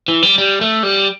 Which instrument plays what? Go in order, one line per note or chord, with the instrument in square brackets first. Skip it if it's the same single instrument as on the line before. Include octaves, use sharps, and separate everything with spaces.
[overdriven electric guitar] E3
G3
G3
A3
G3